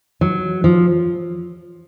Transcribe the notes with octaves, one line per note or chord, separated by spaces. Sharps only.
F#3
F3